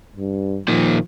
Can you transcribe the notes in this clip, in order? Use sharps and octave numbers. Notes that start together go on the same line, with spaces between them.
G2
A#2 D#3 F3